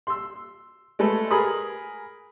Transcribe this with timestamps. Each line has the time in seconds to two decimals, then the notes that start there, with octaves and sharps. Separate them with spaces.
0.07 C6 E6
0.99 G#3 A3 A4 B4
1.31 G#4 A#4 B4 B5 D#6